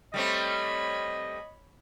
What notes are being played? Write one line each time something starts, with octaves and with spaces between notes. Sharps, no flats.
G3 A3 C4 C#5 D#5 B5